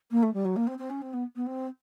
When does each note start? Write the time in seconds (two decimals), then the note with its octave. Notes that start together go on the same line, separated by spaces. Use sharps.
0.11 A#3
0.22 A3
0.33 G3
0.45 F#3
0.56 A#3
0.67 C4
0.78 C4
0.90 C#4
1.01 C4
1.13 B3
1.36 B3
1.46 C4